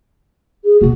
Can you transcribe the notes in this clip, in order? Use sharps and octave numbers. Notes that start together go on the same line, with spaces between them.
G#4
B2 A#3 F#4